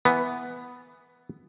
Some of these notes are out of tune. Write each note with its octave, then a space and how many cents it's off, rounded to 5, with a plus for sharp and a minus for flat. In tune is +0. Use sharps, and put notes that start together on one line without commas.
E3 +0 B3 +0